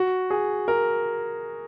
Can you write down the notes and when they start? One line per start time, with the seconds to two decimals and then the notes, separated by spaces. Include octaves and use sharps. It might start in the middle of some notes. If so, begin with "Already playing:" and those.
Already playing: F#4
0.30 G#4
0.68 A#4